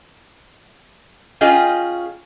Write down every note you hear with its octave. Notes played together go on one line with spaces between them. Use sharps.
C#4 F4 G#4 D#5 G5